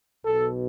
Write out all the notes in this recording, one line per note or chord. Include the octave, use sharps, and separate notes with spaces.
B1 B2 A4